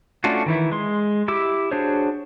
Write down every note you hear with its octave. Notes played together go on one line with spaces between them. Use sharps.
A3 C#4 D4 F4 F#4
D#3 E3 E4
G#3 C6
E4 G4 D6 E6
D4 F#4 G#4 C5 C#5